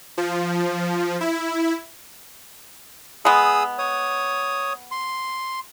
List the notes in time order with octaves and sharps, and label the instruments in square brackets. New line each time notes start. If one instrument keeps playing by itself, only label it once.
[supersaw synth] F3
E4
[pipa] G#3 B3 [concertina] G#4 D#6 E6
[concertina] C#5 D#6
C6